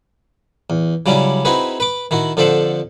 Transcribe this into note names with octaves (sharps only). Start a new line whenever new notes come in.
E2
C#3 F#3 G3 C#4 D4 E4
C4 D#4 E4 F#4 G#4 B4
B4 D6
D#3 E4 F#4
F2 D3 A4 C5 E5 F#5